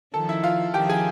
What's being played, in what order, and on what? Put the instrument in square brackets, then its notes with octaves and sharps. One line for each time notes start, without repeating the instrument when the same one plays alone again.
[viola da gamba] D#3 F3 [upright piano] A4 A5
[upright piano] E4 E5
F4 F5
[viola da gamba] D#3 F3 [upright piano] G4 G5
[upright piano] G#4 G#5